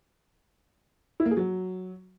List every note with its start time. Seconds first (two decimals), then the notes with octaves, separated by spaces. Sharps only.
1.20 E4
1.25 A#3
1.31 G#4
1.37 F#3